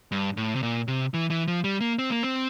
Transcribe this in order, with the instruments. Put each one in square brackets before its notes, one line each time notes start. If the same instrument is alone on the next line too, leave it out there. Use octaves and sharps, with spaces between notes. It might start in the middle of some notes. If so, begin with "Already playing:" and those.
[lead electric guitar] G2
A2
C3
A#2
C3
E3
E3
F3
G3
A#3
C4
A#3
C4